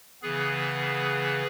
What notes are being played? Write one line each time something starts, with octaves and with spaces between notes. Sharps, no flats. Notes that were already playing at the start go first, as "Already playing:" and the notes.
C#3 E3 B3 G#4 B4